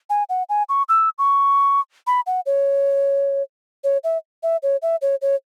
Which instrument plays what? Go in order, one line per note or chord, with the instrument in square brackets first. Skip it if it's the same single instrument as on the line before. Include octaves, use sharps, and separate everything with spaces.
[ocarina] G#5
F#5
G#5
C#6
E6
C#6
B5
F#5
C#5
C#5
E5
E5
C#5
E5
C#5
C#5